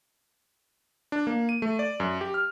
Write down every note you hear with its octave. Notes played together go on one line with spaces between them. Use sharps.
D4
A#3
D#7
A3
D5
F#2
G4
F6